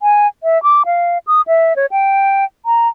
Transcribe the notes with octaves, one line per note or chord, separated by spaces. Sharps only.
G#5
E5
D6
F5
D#6
E5
C#5
G5
A#5